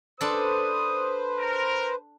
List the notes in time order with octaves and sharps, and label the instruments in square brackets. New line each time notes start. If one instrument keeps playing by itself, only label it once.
[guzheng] D4 A4 [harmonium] B4 C5 [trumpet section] D#6
[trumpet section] A#4